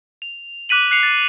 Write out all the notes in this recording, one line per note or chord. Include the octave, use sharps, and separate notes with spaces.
F7
D6 F#6 B6 D#7 F#7
F#6 C7 C#7 F7
A6